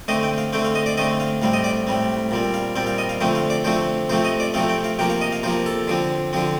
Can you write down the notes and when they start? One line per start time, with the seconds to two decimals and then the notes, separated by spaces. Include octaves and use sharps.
0.08 D3 A3 C4 D#5
0.23 G5
0.38 F5
0.53 D3 A3 C4 G5
0.65 F5
0.75 D#5
0.86 D5
0.97 D3 A3 C4 D#5
1.20 F5
1.42 A2 G3 C4 F5
1.53 D#5
1.64 D5
1.87 A2 G3 C4
2.31 A#2 G3 C4
2.54 F5
2.76 A#2 G3 C4 G5
2.87 F5
2.98 D#5
3.09 F5
3.21 D3 F3 A3 C4 G5
3.35 F5
3.50 D5
3.65 D3 F3 A3 C4 C5
4.09 C3 F3 A3 C4 C5
4.25 D#5
4.40 D5
4.54 C3 F3 A3 C4 F5
4.69 G5
4.84 F5
4.99 C3 F3 A#3 G5
5.10 F5
5.21 D#5
5.32 F5
5.43 C3 F3 A#3 C5
5.66 A4
5.87 D3 F3 C4
6.33 D3 F3 C4